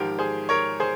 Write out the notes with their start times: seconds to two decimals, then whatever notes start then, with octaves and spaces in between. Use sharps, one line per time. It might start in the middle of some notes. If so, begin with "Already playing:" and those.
Already playing: G#1 G#2 F3 G4 A#4
0.19 G#4 C5
0.49 A#4 C#5
0.80 G#4 C5